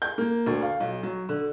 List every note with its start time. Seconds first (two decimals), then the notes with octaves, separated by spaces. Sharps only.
0.02 G6
0.18 A#3
0.46 D2
0.62 F5
0.80 B1
1.03 F#3
1.29 D3